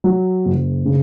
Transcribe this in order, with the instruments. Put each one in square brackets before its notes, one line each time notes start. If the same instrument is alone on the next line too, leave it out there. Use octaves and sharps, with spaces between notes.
[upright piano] F#3
F#1
C#3